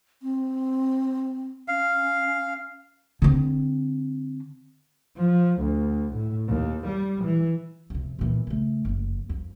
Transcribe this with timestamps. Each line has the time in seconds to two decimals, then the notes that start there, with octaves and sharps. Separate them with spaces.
0.22 C4
1.68 C#4 F5
3.22 D3 C4
5.17 F3
5.60 D2
6.14 A2
6.47 D#2
6.87 G3
7.24 E3
7.90 F2 C3
8.19 A#2 E3
8.47 C#3 A3
8.85 F#1 F2
9.29 F2